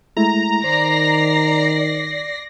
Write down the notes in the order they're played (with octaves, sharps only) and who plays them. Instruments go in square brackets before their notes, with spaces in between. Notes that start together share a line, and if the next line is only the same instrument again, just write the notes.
[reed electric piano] G#3 A3 E4 [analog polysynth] A#5
[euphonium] D#3 [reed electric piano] C5 [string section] D5 A#6 C7